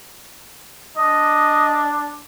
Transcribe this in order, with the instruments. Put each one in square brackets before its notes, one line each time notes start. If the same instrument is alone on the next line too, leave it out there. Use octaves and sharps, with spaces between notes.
[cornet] D4 [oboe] D#5